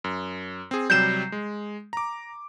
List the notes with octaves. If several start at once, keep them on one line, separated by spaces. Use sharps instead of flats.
F#2
C4 G#4
C3 F#3 G3 G6 C7 E7
G#3
A#5 D6